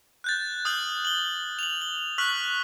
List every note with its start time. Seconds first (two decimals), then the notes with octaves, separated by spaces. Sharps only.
0.24 F#6 G6 A6
0.65 D#6 F6 G6 F#7
1.05 F#7 G7
1.59 F7 F#7
1.81 G7
2.18 C#6 F6 F#6 B6 F#7